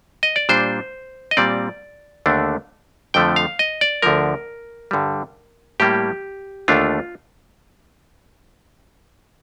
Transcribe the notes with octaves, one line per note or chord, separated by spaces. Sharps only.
D#5
D5
A#2 G3 D4 C5
D#5
A#2 G3 C4 D5
D#2 D3 A3 D4
F2 D3 F3 A3 G5
F5
D#5
D5
D2 D3 F3 A#4
G2 D3 G3
A2 G3 A#3 G4
D#2 D3 A3 D4 F4